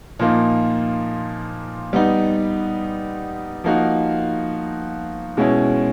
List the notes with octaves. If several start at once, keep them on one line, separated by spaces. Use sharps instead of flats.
A#2 F3 A#3 D#4
G3 B3 D#4
F3 A#3 D#4 F#4
B2 G#3 C#4 E4